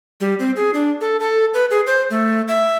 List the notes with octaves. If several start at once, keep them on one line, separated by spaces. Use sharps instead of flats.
G3
C4
G#4
D4
A4
A4
B4
G#4
C5
A3
E5